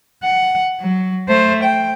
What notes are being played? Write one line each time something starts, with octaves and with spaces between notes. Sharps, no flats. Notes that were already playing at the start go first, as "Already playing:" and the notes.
F#5
F#3
A3 C5
G5